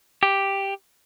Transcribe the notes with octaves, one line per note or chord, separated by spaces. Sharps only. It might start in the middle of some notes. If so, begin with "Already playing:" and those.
G4